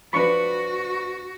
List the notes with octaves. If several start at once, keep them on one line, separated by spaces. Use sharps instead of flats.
F3 D4 F#4 B4 B5 C#6